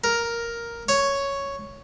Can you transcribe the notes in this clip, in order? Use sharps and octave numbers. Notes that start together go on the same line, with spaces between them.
A#4
C#5